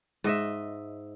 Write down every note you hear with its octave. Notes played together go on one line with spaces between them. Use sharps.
G#2 D#5 E5